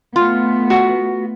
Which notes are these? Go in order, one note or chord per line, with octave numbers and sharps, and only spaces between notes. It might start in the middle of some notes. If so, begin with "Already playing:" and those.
A3 B3 F4
F#4